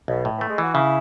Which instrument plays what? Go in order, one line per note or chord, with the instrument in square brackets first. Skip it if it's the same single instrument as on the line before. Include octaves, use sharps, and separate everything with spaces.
[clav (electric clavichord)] B1 [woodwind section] B2
[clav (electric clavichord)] A2
[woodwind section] E3 [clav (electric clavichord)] A3
[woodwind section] G#3
[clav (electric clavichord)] E3 [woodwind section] F#4
[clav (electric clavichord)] C#3 [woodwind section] E4